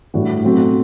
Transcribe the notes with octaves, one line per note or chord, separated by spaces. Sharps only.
A2 E3 G3 D4 F#4
B2 F#3 A3 C4 F#4